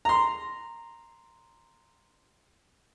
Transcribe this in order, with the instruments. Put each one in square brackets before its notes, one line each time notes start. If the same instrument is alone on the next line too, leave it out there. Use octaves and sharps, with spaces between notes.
[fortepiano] A#5 C6